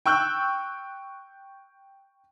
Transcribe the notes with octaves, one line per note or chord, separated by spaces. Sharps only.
G5 C#6 E6 F#6 G6